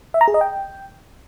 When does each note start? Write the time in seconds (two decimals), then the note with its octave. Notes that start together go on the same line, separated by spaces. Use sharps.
0.14 E5
0.21 A#5
0.28 G#4
0.34 D#5
0.41 G5